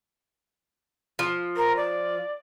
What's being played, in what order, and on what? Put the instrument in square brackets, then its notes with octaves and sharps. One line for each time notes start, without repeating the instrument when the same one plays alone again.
[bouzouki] F3
[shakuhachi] A#4
D5